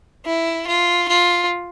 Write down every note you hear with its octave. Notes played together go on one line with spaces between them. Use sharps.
E4
F4
F4